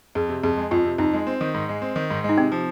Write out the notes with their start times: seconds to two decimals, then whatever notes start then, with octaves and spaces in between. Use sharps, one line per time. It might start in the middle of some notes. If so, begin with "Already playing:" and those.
0.15 F2 G#4
0.29 C3
0.43 F2 G#4
0.57 G#3
0.71 F2 F4
0.85 C3
0.98 F2 D#4
1.13 G#3
1.27 C4
1.41 D#3
1.54 G#2
1.69 G#3
1.82 C4
1.96 D#3
2.10 G#2
2.24 G#3 D#4
2.37 C3 C4
2.52 F3